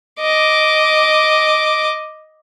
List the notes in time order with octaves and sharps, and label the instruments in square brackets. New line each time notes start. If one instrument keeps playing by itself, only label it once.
[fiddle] D#5 D6